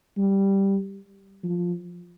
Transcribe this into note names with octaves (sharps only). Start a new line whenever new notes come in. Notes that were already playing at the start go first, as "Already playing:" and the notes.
G3
F3